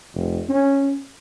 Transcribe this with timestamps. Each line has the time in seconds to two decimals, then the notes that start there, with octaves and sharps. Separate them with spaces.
0.14 F1
0.49 C#4